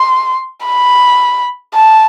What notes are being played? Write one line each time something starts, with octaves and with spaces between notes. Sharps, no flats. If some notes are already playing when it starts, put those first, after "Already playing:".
Already playing: C6
B5
A5